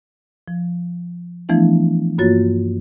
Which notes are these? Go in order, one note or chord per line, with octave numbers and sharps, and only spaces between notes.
F3
E3 F3 A3 B3 D4 E4
G2 A#3 F4 F#4 C#5 A6